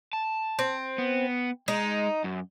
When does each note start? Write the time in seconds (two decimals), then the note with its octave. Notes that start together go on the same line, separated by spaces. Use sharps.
0.13 A5
0.59 C4
0.98 B3
1.68 G#3 D#4
2.24 F#2